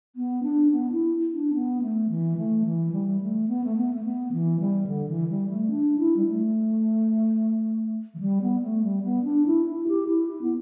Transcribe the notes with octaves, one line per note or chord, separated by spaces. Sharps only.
B3
D4
B3
E4
D4
B3
A3
E3
A3
E3
G3
A3
B3
A3
B3
A3
B3
E3
G3
D3
E3
G3
A3
D4
E4
G3
A3
E3
G3
B3
A3
G3
B3
D4
E4
E4
G4
E4
E4
B3